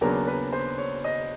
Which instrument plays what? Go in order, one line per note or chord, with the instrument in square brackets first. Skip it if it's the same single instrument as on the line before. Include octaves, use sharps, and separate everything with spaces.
[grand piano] D#2 C#3 F#3 B3 D4 A#4
B4
C5
C#5
D#5